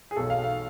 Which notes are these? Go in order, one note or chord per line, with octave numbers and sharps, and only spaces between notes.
G#4
B1 B2 A4
F5
F5